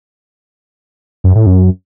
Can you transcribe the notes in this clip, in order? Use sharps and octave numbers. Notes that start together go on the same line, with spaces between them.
F#2
A2
F#2